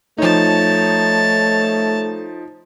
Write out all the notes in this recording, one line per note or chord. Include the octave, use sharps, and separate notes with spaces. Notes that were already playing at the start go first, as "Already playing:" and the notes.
F3 A3 D#4 C#5 A5